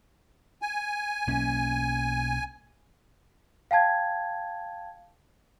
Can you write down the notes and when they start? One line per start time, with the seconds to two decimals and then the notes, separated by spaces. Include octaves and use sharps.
0.62 G#5
1.27 B1 A#3 C#4
3.71 F5 G5 A5 G#6